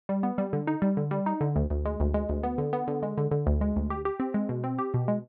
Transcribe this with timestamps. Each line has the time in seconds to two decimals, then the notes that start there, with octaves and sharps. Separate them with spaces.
0.09 G3
0.23 B3
0.38 G3
0.53 D3
0.67 D#4
0.82 G3
0.97 D3
1.11 G3
1.26 D#4
1.41 D3
1.56 D2
1.70 D2
1.86 G#3
2.00 D2
2.14 G#3
2.29 D2
2.43 B3
2.58 D3
2.73 B3
2.88 D3
3.03 G#3
3.18 D3
3.31 D3
3.47 D2
3.61 G#3
3.76 D2
3.90 G4
4.05 G4
4.20 C4
4.34 G#3
4.49 B2
4.64 C4
4.78 G4
4.94 B2
5.08 G#3